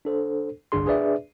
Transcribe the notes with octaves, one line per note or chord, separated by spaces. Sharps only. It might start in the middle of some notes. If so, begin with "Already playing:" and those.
D4 A4 C5
G1 C2 D4 G#4 C6
D4 G#4 B4 D5 E5